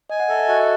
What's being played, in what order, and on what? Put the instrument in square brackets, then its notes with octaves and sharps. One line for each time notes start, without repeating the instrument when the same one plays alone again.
[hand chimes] D#5 [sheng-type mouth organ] G#5
[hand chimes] F#5
[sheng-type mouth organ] A4 [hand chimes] E5
[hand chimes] E5
[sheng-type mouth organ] F#4 [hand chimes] D#5